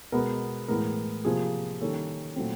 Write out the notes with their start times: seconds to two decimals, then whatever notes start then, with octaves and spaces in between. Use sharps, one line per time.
0.12 B2 G#3 B3 A#4
0.68 A2 E3 G#3 B3 A#4
1.25 C3 F3 A#3 G#4
1.81 D#3 G3 A#3 C#4 A4
2.36 A#2 F#3 A3 C4